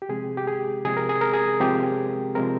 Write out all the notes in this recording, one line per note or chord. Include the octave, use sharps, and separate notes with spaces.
G4
C3 F3 G#3 C4 G#4
G4
G#4
C3 F3 G#3 C4 G#4
A#4
G#4
A#4
G#4
C3 F3 G#3 C4 G4
C3 F3 G#3 C4 A#4